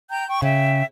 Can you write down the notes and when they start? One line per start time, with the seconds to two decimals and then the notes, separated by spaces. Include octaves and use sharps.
0.10 G5 A#5 G6
0.28 G5 C#6
0.42 C#3 E5 G5